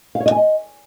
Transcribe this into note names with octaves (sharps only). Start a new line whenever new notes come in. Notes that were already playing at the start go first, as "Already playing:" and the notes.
F5
C#5
D#5
G#5
D#5